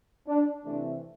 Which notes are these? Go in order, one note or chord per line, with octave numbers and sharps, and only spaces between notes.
D4
C3 E3 A3 C4 D4